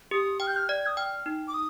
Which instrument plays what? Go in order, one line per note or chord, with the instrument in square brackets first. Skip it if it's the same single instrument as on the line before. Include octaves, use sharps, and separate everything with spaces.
[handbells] G4 [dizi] D#6
[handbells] G5 [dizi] F6
[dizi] G6
F6
[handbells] D5 [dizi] G#6
[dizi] D#6
[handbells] G5 [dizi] F6
[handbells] D#4
[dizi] D6
D#6